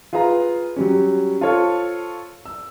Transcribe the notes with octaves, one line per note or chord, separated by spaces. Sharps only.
F4 G#4 B4 F5 A#5
F#3 G3 C#4
F4 A4 C5 C#5 A5 F6
E6